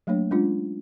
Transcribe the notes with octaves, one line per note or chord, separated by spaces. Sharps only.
F#3 A3 A#3 D4 C#5
G#3 C#4 D4 F4